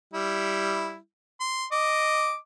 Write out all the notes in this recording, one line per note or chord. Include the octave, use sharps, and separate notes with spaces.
G3 E4
C6
D#5 D6